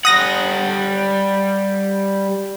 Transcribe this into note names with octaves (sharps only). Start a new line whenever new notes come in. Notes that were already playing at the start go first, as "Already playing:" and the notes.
G3 F#5 D#6 A#6